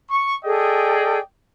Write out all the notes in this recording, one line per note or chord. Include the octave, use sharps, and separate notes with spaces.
C#6
G#4 A4 D5 D#5 G5